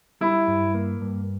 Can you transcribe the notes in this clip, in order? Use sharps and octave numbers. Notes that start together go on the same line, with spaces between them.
G3 E4
G2
A#3
G2